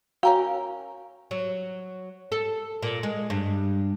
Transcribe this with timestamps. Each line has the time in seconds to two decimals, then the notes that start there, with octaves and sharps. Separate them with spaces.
0.23 C#4 F#4 A#4 F5 G5
1.31 F#3
2.32 A4
2.82 A#2
3.03 G#3
3.30 G2